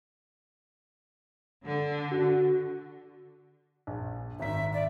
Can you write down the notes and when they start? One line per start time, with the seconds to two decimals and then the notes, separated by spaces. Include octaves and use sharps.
1.65 D3
2.12 F#4
3.87 A#1
4.40 G#1 E5 A#5 B6
4.73 D5